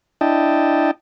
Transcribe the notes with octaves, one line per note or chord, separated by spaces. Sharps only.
D4 E4 D#5 G5 A5